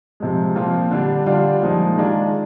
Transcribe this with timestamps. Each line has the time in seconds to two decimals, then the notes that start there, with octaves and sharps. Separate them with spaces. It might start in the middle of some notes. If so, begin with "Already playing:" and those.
0.20 C3 F3 G#3
0.55 A#2 F3 C4 F4
0.91 D3 G3 D4
1.26 D3 G3 D4 F4
1.62 A#2 F3 G#3 D#4
1.97 D#3 G#3 D4 F4